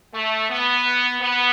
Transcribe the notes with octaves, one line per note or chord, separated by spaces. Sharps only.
A3
B3
B3